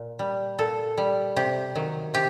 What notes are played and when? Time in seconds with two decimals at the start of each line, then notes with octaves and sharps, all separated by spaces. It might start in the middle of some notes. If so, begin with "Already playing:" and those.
Already playing: A#2
0.19 G3
0.58 A#2 A4
0.98 G3
1.36 C3 G4
1.75 D#3 F#3
2.14 C3 G4